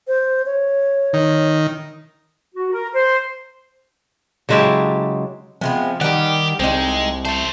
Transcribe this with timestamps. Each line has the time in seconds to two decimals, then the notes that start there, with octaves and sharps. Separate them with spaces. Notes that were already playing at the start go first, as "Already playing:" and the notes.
0.07 C5
0.46 C#5
1.13 D#3
2.55 F#4
2.73 A#4
2.93 C5
4.49 C#3 F#3 G#3 E4 G4 A5
5.61 C3 F3 G#3 B3
6.01 D#3 G3 G4 F#5
6.60 C2 G#3 C4 D#4
7.25 A3 A4 C5